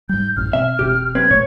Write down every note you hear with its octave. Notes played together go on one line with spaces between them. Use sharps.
G#2 G3 G6
A1 F#2 A2 F6
B2 C4 E5
E1 B2 C4 G4
B1 C4 B4 G#6
A#2 A3 C#5